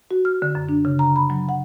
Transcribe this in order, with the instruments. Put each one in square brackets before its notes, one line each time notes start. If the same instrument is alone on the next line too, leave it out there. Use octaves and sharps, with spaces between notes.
[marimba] F#4
F6
D3
F#2
D4
C#3
A#5
B5
F#3
F#5